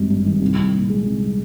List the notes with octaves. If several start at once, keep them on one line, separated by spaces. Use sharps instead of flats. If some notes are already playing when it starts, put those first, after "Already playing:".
Already playing: G#1 G2 D#3 G3
G2
D#3
C2
C2
A#2
G#3
C2